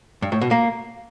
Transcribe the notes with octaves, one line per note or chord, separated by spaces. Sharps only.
G2
A2
B2
A#3